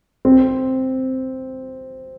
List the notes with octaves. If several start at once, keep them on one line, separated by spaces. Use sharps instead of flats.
C4